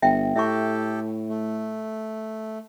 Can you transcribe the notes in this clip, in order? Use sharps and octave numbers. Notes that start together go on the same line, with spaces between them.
G1 E5 G5
A2 G4 A4 E5 C#6
A3